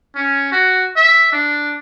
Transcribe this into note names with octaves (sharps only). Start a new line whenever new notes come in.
C#4
F#4
E5
D4